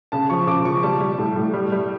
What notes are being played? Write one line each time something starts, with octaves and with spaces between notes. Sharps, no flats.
C#3 A5
F3 C#6
C#3 D6
F3 C#6
G3 A5
G3
A2
A2
G3
G3